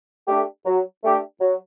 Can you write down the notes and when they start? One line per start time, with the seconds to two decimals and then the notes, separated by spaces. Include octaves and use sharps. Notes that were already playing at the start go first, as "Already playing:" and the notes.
0.28 A3 D4 G4
0.66 F#3
1.04 A3 D4 G4
1.41 F#3